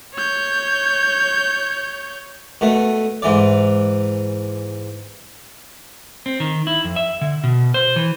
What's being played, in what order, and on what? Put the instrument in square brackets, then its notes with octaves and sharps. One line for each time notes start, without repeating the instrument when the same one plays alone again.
[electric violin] C#5 G6
[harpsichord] B2 A3
G#2 E3 D5
[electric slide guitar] C4
D#3
E4
F2
E5
D3
B2
C5
E3